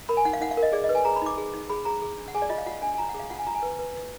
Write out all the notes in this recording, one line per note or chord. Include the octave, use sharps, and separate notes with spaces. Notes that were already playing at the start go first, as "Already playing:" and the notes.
A#4 B5
G#5
D#4 F#5
F5
D#4 F#5
F5
A#4
D#5
G#4 D5
D#5
B4
G#5
G#4 A#5
B5
D#4 D6
G#4
D#4
G#4 B5
G#4 A#5
G#4
D4
F#5
G#4 G#5
D5
F4 D#5
F5
F4 F#5
D4 G#5
G#5
F4 A#5
F#5
G#4
F5
F4 F#5
G#5
F4 A#5
G#5
B4
B4
B4